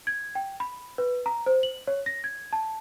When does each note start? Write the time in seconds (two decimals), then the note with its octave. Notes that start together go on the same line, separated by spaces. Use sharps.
0.07 G#6
0.35 G5
0.60 B5
0.98 B4
1.26 A#5
1.46 C5
1.63 F#7
1.87 C#5
2.06 A#6
2.24 G#6
2.53 A5